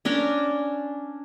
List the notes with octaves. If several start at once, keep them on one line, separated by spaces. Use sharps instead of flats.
C#4 D4 A#4